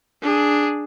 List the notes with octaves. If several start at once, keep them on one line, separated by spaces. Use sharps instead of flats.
D4 G#4